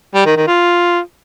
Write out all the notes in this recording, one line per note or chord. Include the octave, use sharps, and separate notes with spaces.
G3
D#3
D#3
F4